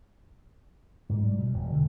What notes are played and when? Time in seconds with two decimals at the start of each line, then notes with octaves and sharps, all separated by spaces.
1.09 G#2
1.24 G3
1.38 B2
1.54 E1
1.72 D3